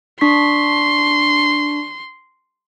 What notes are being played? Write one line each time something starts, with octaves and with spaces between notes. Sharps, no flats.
D4 C6 C#6 B6